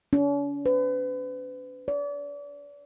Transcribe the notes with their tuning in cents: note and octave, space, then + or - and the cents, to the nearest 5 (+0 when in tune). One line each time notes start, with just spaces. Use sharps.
C#4 +45
B4 +40
D5 -35